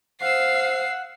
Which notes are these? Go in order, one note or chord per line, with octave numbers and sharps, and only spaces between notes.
C5 F5 F#5 E6 C7